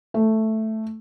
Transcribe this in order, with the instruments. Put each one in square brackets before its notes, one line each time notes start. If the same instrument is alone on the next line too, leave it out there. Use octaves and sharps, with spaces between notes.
[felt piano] A3